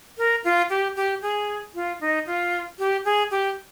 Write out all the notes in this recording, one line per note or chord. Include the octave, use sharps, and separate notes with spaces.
A#4
F4
G4
G4
G#4
F4
D#4
F4
G4
G#4
G4